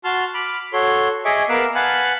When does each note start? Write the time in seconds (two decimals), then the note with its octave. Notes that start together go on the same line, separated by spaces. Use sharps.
0.04 F#4 A5 C6 F6
0.34 B5 D6 F6
0.73 F#4 A4 C#5 C6
1.25 G#4 D#5 E5 G#5 C#6 D6
1.49 B3 A#4 F5 D6 E6 F#6
1.75 B4 F5 F#5 G#5 A5 B5